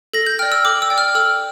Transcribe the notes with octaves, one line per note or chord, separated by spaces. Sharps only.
A4 A#6
G6
D5 G5 F6
E6
A4 D6
E6
D5 G5
F6
A4 E6